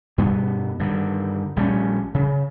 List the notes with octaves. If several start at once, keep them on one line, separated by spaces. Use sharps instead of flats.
G2 B2 G3 B3
G2 D3 D#3
A#1 G3 A3 C#4
C#3